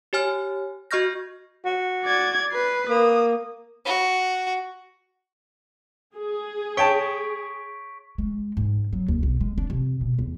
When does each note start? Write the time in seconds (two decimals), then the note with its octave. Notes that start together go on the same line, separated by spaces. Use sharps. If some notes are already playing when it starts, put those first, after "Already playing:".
0.13 G4 C#5 G#5 F6
0.91 F#4 D#5 C#6 F6 G6 A#6
1.65 F#4
2.04 D5 G#6
2.52 B4 C7
2.89 A#3 D#6
3.85 F#4
6.16 G#4
6.77 C#5 G5 A5 C#6 B6 D7
8.18 G#3
8.57 G#2
8.93 F#3
9.08 D#2
9.23 B1
9.41 G#3
9.58 D4
9.70 C3
10.01 B2
10.19 E2